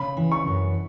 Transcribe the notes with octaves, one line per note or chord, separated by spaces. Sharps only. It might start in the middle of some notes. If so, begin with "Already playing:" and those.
Already playing: C#3 B5
E3
C#6
F#2